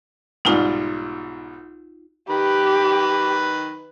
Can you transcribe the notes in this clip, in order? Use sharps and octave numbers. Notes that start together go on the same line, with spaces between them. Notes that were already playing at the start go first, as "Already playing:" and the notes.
B1 G#2 G3 D#4 F4
D#3 G4 B4 B5